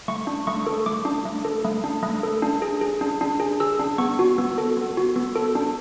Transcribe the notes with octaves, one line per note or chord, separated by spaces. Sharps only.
A3 C#6
D4
A3 C#6
A4
A3 D6
D4
A3
A4
A3
D4
A3
A4
D4
G#4
G#4
D4
D4
G#4
G#4 E6
D4
B3 C#6
F#4
B3
A4
B3
F#4
B3
A4
D4